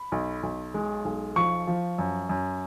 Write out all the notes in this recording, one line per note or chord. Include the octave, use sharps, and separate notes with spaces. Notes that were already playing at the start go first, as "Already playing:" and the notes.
Already playing: B5
B1
B1
G#3
B1
F3 C#6
F3
F#2
F#2